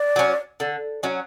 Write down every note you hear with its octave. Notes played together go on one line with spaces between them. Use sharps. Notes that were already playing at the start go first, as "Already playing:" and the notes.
Already playing: D5
F#3 C#4
D3
F#3 C#4